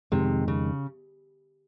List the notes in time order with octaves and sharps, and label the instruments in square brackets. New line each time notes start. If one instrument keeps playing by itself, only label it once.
[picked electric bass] F2 D#3 G#3 [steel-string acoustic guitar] C3
[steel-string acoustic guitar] C#3